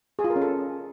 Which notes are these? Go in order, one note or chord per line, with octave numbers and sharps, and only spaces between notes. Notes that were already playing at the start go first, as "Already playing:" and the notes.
G#4
F4
A#4
C#4
A4